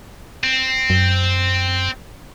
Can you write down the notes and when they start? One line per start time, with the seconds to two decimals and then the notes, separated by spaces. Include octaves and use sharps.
0.43 C4
0.90 F#2